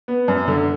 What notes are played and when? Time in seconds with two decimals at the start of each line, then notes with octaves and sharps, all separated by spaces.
0.08 B3
0.28 F#2
0.48 D3